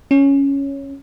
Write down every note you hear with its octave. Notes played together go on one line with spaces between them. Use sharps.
C#4